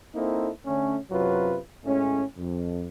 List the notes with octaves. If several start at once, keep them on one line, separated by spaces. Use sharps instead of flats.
A#3 C4 D#4 E4 A4
D3 A3 C#4
F#2 C3 F#3 F4 B4
A2 G#3 A3 C#4
F2